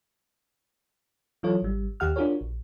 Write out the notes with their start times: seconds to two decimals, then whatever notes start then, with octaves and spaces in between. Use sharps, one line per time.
1.43 E3 F#3 F4 A4 C#5
1.62 G#1 G3
2.00 D#2 G4 F#5 F6
2.16 D4 F4 F#4 G#4 A#4 C#5
2.41 A#1